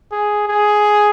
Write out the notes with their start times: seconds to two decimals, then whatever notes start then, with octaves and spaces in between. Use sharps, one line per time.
0.12 G#4
0.48 G#4